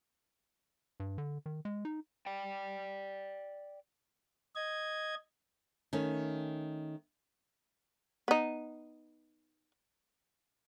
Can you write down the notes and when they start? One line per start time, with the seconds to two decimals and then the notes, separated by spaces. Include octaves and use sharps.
1.00 G2
1.18 D3
1.46 D#3
1.65 G#3
1.85 D#4
2.26 D5 G5
4.55 D#5 G#6
5.93 D#3 A3 C#4
8.28 B3 D#4